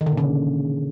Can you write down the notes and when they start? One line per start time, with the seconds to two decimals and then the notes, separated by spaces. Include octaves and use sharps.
0.01 D#3
0.06 D3
0.12 A#2
0.17 C#3